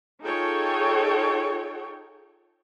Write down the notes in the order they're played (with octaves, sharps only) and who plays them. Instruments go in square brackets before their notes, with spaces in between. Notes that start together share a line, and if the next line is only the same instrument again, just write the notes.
[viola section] D#4 F4 G#4 A4 C#5 G5